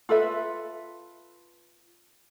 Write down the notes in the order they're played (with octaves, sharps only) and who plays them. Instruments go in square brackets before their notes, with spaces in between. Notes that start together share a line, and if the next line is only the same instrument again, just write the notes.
[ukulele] F4 A4 B4 E5